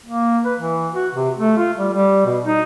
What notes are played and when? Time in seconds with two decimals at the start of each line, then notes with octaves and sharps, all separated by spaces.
0.06 A#3
0.45 B4
0.59 E3
0.94 F#4
1.15 C3
1.38 A3
1.57 F4
1.78 G3
1.93 G3
2.26 B2
2.46 D#4